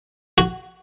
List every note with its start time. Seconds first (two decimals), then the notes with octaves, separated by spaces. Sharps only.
0.38 F#4